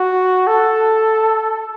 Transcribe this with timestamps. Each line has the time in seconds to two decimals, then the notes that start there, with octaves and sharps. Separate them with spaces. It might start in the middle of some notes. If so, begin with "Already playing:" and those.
Already playing: F#4
0.47 A4